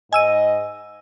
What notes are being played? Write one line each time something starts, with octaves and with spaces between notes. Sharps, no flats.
G#2 D#5 G#5 E6 D#7